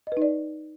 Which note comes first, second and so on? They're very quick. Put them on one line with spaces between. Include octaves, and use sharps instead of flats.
D#5 B4 D#4 D5